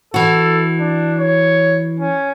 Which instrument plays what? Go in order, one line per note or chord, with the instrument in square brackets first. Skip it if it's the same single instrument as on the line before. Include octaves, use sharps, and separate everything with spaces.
[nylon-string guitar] E3 F#4 [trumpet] A4
[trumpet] D4
C#5
C#4